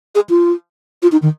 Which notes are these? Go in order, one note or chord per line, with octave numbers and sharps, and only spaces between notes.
G#4
F4
F4
D#4
D#3